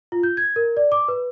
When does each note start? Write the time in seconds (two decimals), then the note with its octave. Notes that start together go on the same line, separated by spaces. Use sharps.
0.12 F4
0.23 G6
0.37 G#6
0.56 A#4
0.77 D5
0.92 D6
1.08 B4